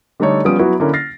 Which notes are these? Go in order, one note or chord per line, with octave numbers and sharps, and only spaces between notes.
D3 G3 A3 D#4 A4 C#5
F3 G3 B3 C#4 D#6 D7
F#3 B3 E4 F#4
D3 A#3 C#4 E4
F6 A6 A#6 C7